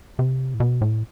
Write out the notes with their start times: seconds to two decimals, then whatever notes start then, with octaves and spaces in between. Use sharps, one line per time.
0.19 C3
0.54 A2
0.60 B2
0.81 A2